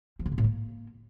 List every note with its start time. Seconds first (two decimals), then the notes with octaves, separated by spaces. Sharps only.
0.19 F3
0.26 D3
0.32 A#2
0.38 A2
0.44 A#3